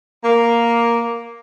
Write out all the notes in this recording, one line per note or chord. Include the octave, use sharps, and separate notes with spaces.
A#3